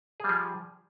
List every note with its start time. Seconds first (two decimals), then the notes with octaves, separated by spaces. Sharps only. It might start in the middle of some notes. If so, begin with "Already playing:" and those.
0.20 G#4
0.24 G3
0.29 F3